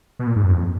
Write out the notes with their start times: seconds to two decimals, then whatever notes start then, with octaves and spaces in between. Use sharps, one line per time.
0.19 B2
0.27 A#2
0.36 G#2
0.43 F#2
0.52 F2